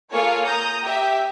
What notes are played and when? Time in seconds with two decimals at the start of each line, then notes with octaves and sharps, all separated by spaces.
0.12 A#3 F4 G#4 A4 C#5 F5
0.45 A#5 D#6 G6
0.83 G4 E5